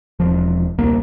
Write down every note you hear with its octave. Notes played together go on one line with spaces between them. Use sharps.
E1 F3
D#1 C2 A#3